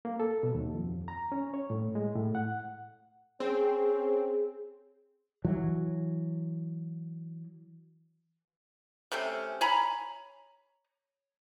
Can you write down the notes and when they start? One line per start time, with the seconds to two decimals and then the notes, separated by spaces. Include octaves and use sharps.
0.05 A#3
0.20 A4
0.43 B2
0.55 D#2
0.75 F2
1.08 A#5
1.32 C#4
1.54 C#5
1.70 A2
1.95 G#3
2.16 A2
2.35 F#5
3.40 C4 C#4 G#4
5.45 E3 F#3
9.12 C3 A3 C4 C#4
9.61 C#5 G#5 A#5 B5